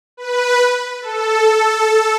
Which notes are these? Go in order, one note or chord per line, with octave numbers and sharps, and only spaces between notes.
B4
A4